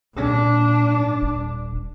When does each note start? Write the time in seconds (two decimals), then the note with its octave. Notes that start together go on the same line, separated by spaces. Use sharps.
0.14 A#2 D4
1.22 D#1